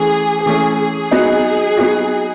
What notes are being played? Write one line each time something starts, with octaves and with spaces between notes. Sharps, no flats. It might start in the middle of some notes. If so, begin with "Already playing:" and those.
Already playing: E3 A3 C#4 G#4
E3 A3 C#4 G#4
G#4
F#3 B3 D#4 F#4
F#3 B3 D#4 F#4